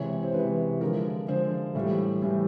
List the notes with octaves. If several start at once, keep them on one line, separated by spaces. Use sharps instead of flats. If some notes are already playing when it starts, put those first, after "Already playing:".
Already playing: C3 E3 G#3 C#5
C5
C3 E3 G#3 B4
D3 F3 G#3 A#4
D3 F3 G#3 C5
A2 E3 G3
A2 E3 G3